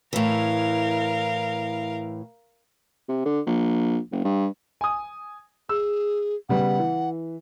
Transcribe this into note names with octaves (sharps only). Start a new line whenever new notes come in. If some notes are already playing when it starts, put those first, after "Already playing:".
A2 E3 A#4 F5
C3
D3
A#1
F#1
G2
G#5 D#6
G#4 E6
C#3 G3 B3 F#5
E3